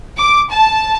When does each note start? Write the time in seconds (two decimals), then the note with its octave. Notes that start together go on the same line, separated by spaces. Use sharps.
0.18 D6
0.50 A5